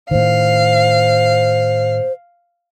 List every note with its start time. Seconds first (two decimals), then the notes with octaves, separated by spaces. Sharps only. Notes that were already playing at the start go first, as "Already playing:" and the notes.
0.11 A2 D#3 C5 F5